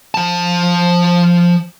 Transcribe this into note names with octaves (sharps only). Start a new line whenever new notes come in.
F3 A5